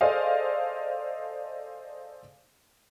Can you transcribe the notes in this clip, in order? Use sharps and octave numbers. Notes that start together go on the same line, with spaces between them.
G#4 A4 C5 D5 D#5 F5